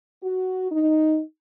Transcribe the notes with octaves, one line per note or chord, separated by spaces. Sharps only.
F#4
D#4